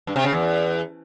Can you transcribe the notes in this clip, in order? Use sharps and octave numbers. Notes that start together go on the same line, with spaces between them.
G2
C3
C#3
E2